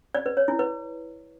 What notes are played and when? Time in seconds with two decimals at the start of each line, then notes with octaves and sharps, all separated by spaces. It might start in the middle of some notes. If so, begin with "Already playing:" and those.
0.15 D5
0.26 B4
0.37 C#5
0.48 E4
0.59 B4